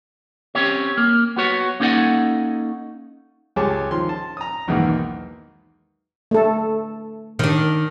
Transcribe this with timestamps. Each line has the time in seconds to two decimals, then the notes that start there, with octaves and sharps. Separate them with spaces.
0.55 C4 C#4 G4 C#5
0.97 A#3
1.36 B3 F#4 C#5
1.80 A#3 C#4 D#4 A4 D#5 F#5
3.56 C#2 G4 G#4 C#5 A5 D6
3.91 D#3 F3 C6
4.09 A5
4.37 A#5 D#6
4.68 B1 E2 G#2 D#3 A#3
6.31 A3 A4
7.39 D#3 D4